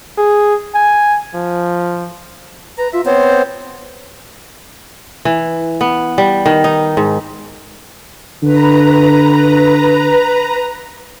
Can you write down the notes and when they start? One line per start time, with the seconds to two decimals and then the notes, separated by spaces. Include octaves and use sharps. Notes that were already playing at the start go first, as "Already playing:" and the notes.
0.18 G#4
0.74 G#5
1.34 F3
2.78 B4 A#5
2.93 F4 E5
3.05 B3 C4 C5 C#5
5.25 E3
5.81 B3
6.18 G3
6.46 D#3
6.64 D#4
6.97 G#2
8.43 D3 B4 A#5